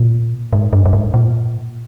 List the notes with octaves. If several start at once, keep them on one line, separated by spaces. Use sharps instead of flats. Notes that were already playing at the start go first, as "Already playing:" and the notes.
Already playing: A#2
G#2
G2
G2
G#2
A#2